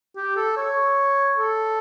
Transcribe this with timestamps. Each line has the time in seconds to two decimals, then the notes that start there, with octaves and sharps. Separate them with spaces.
0.16 G4
0.36 A4
0.57 C#5
1.38 A4